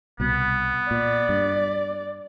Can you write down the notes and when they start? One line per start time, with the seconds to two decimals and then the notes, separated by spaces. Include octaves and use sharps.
0.20 C2 B2 B3
0.91 A#2 D5
1.29 G2